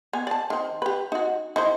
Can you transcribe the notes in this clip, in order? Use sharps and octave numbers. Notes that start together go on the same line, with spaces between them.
B3 G#5
D5 A5
D#3 C4
G4 B4
D#4 F#4
D#4 E4 C5